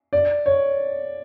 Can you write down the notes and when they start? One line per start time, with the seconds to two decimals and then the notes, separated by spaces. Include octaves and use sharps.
0.13 D5
0.46 C#5